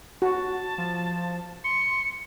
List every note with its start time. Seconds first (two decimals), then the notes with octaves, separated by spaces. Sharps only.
0.22 F#4 A5
0.78 F3
1.64 C6 C#7